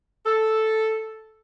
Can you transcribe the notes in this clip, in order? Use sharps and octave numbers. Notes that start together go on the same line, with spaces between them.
A4